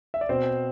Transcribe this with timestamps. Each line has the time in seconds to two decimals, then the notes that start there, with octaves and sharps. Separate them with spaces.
0.14 E5
0.21 D5
0.29 B2 C4 C5